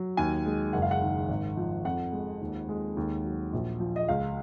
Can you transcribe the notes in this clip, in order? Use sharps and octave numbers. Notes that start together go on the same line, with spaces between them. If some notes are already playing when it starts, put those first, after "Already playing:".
Already playing: F#3
D#2 G#5
G#3
F#1 F#5
F5
F#5
D#3
G#1
F3
F2 F#5
G#3
D#2
G#3
D#2
F#3
A#1
F3
D#5
C#2 F5